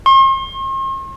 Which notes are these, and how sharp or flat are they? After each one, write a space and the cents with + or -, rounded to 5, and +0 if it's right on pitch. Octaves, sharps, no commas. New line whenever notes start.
C6 +45